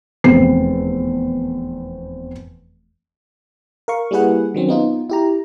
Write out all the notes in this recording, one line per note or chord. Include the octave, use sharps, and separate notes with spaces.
F1 E2 C4 C7
A#4 F5 C#6
G3 A#3 E4 G#4 B4 F#5
D#3 F#3 C4 C#4
B3 D#4 F4
E4 G4 A#5